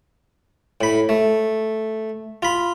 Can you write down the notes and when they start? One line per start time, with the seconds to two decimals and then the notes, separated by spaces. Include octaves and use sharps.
0.81 A2 B5
1.09 A3
2.42 F4 B5